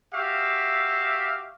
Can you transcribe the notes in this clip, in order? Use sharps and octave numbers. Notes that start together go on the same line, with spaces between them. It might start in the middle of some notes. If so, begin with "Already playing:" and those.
F#4 G4 E5 F5